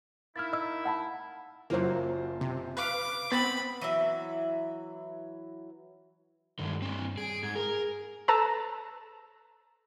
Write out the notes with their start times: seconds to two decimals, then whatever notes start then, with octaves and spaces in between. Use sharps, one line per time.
0.36 A#3 D#4 E4 F6 A6
0.53 D#5 E6
0.85 F#5 A5 B5
1.70 F#1 F#3 A#3 F4 C5
2.41 C3
2.77 B4 F5 D6
3.32 B3 C4 B5 A6
3.81 E3 F#3 E5
6.59 G2 D3 D#3 G#3
6.82 C4 D4
7.18 G#4 D7
7.43 G#2 G#6
7.55 G#4 A#4
8.28 A4 B4 A5 A#5 E6